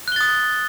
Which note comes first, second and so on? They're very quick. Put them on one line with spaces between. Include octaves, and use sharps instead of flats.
F#6 G7 A6 D#6